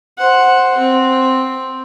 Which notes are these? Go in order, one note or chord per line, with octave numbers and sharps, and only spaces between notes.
C5 F#5
C4